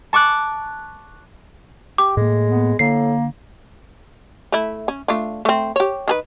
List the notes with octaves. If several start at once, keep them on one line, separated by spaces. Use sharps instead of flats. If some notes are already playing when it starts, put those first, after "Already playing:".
A5 C#6 D6 F#6
G4 D6
A2 G#3 A#3
B3
A2 D3 A#3 C7
A3 E4
C#4
A3 D4 F4
A3 C4
G4 C#5
D#3 G#4 B4